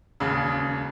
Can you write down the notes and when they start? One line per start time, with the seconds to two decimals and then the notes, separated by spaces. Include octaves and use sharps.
0.20 E1 D#2 C#3